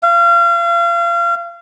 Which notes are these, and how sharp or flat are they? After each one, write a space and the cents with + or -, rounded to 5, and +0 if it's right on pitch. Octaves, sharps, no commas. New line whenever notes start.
F5 -35